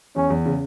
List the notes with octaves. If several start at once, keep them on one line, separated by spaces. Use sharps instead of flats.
E2 C#4
E2
C#3